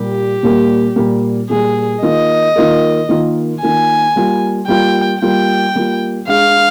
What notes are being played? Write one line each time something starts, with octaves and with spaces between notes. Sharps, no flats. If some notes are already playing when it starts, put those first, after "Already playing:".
Already playing: A#2 G3 A#3 G4
A#2 G3 A#3
A#2 G3 A#3
A#2 G3 A#3 G#4
D#3 A#3 F4 A#4 D#5
D#3 A#3 F4 A#4
D#3 A#3 F4 A#4
D#3 A#3 F4 A#4 G#5
G3 A#3 F4
G3 A#3 F4 G5
G3 A#3 F4 G5
G3 A#3 F4
G#3 D4 G#4 F5